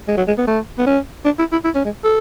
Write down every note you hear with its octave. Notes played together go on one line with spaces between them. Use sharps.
G#3
F#3
G#3
B3
A3
B3
C#4
D4
E4
E4
E4
C#4
G#3
A4